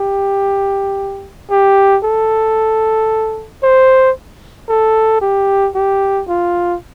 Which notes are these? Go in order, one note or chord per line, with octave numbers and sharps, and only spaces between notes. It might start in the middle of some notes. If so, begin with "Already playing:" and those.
Already playing: G4
G4
A4
C5
A4
G4
G4
F4